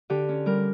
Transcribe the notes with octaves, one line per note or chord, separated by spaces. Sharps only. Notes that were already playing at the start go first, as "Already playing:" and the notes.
D3 G4
C#4
G3 A#4